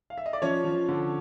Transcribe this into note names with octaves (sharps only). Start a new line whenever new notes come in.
F5
E5
D#5
D5
F3 C#4 C#5
F3
D3